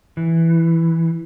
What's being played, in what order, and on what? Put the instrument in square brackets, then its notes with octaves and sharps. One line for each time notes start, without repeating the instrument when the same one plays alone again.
[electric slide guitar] E3